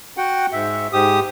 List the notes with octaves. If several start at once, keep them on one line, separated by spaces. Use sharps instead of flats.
F#4 F#5 G5
G#2 E5
G#2 G4 D#6